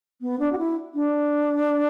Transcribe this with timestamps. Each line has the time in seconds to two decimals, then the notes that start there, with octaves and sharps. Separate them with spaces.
0.21 B3
0.39 D4
0.52 F#4
0.58 E4
0.94 D4